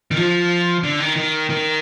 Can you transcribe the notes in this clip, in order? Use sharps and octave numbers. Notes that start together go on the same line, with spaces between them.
D#3
F3
D3
D#3
D#3
D#3